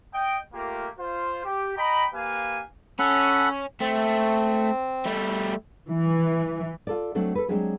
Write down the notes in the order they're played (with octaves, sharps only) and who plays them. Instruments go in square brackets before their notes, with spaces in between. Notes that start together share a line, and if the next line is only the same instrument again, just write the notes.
[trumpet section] D#5 G5
A3 A#3 F4 G4 A#4
F4 C5
G4
D#5 G5 A#5 B5
A#3 G4 B4 F5 G#5
[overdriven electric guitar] C#4 [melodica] A4 F#5 B5
[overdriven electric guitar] A3 [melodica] C4
[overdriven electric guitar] G3 A3
[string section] E3
[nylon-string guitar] F4 A4 D5
F#3 A3 C4 D4 A4
A4 B4
F#3 G#3 C4 D4 G4 G#4